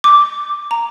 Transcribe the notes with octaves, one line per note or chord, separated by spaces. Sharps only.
D6
A#5